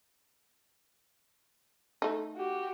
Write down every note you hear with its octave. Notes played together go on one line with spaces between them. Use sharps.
A3 D#4
F#4 G4